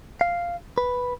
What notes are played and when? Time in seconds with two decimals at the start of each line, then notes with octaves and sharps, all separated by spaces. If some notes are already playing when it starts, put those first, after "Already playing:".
0.21 F5
0.78 B4